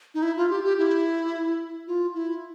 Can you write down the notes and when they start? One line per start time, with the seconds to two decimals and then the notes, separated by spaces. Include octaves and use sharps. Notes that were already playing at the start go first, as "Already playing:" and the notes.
0.14 D#4
0.22 E4
0.37 F4
0.50 G4
0.64 G4
0.78 E4
1.87 F4
2.14 E4